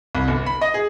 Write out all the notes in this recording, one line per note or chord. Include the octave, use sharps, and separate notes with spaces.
C2
G1
B5
D#5
G#4